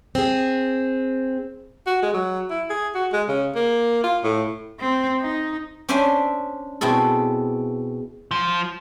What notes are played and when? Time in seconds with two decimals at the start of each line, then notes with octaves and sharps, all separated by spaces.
0.15 C4 G#4
1.86 F#4
2.02 G#3
2.14 F#3
2.50 E4
2.70 G#4
2.95 F#4
3.13 G#3
3.28 C#3
3.55 A#3
4.03 F4
4.23 A2
4.80 C4
5.22 D#4
5.89 C#4 D4 C5 E5 G#5 C6
6.81 B2 C4 E4 G#4 A4
8.31 F3